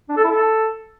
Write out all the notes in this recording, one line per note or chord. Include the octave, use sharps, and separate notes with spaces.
D4
A4
E4
A4